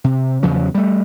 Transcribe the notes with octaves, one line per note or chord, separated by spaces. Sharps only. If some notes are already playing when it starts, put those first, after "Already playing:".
C3
E2 C#3 F3 F#3
G3 A3